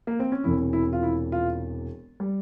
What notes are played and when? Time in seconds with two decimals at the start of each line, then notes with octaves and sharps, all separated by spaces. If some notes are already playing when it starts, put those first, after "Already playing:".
0.07 A#3
0.20 C4
0.32 C#4
0.44 E1 E2 C3 E3 E4
0.73 E4
0.93 F4
1.03 E4
1.32 F4
2.20 G3